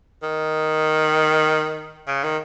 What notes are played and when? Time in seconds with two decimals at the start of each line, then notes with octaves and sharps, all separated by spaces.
0.22 D#3
2.07 C#3
2.23 D#3